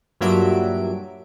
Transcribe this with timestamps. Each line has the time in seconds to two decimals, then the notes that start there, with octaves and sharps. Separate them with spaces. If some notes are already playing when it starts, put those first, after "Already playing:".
0.21 G2 A#2 F#3 E5 D7